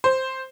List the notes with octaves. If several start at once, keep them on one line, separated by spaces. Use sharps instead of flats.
C5